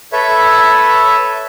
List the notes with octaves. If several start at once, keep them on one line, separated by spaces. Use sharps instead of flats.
A4 B4 C#5 E5